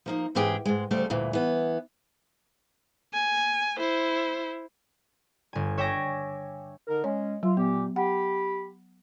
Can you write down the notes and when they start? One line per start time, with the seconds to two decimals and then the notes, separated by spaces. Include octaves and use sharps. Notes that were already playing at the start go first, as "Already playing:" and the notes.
0.06 F3 A#3 D#4
0.35 G#2 E3 C#4 G4 G#4 G5
0.65 G#2 G#3
0.91 D2 C#3 G3 A3 G4 C5
1.10 D2 G2 A#2 E3
1.33 E3 B3
3.14 G#5
3.78 E4 C5
5.53 G1 G#5
5.78 C#5 E5 G5 G#5 D6 A#6
6.87 D3 D#4 A#4
7.04 G#3 C#4 C#5
7.43 F#3 F4
7.57 A#2 B3 G4
7.96 G4 F#5 B5